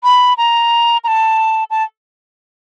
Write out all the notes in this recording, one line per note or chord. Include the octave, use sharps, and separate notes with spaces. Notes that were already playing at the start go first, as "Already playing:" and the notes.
B5
A#5
A#5
A5
A5